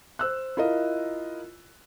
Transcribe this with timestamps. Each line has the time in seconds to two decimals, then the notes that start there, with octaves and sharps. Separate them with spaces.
0.19 C5 E6 F#6
0.57 E4 F4 A#4 D#5